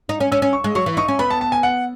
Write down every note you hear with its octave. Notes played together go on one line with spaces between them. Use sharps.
D#4
C#4
C#4 E6
C#4
C#6
G#3
F#3 C#6
E3
D#4 C#6
C#4
B3 B5
A5
A5
G#5
F#5